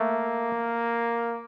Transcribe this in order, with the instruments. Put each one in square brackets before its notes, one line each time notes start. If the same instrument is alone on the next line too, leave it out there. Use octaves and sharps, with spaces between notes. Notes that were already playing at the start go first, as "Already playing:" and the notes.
Already playing: [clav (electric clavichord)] A3 [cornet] A#3